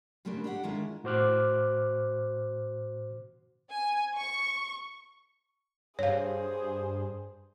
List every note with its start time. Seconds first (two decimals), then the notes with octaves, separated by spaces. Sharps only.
0.25 C#3 G3 A3 A#3 C4 D4
0.44 D4 G4 A4 D5 F#5
0.63 D#3 G#3 D4 E4 F4
1.04 A2 F#4 C5 D6 F6 F#6
3.72 G#5
4.17 C#6
5.99 G2 G#4 C5 C#5 F5